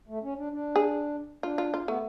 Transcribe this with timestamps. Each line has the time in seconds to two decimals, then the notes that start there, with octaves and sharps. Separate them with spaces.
0.08 A3
0.23 C#4
0.38 D4
0.53 D4
0.76 G#4
1.43 D4 F4
1.58 F4
1.74 F4
1.88 A3 B3